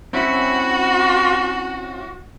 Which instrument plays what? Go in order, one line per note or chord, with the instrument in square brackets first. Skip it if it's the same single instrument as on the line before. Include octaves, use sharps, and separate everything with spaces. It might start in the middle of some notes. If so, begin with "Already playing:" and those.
[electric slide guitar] C4 C#4 E4 [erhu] F#4